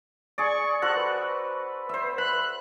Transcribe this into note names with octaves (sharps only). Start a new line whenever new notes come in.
G#4 D5 C#6
F#4 A4 C5 F#6
B4
C5 E5
B5 F#6